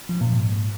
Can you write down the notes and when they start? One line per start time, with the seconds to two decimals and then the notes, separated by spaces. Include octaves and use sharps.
0.09 F3
0.21 A#2
0.33 G#2